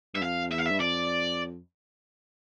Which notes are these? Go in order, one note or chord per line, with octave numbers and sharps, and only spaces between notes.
G2 E5
F2 F5
E2 E5
F5
E5
G2
F2 D5